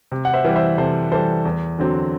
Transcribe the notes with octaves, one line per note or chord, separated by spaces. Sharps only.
C3
F#5
C5 E5
E3 G3
C5 E5
C3 A4 C5
E3 G3 A4 C5
E2
D3 F#3 C4